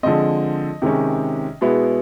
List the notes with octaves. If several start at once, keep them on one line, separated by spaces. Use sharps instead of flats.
D3 F3 G#3 C4 D#5
C3 D#3 G#3 C#4
B2 G#3 B3 E4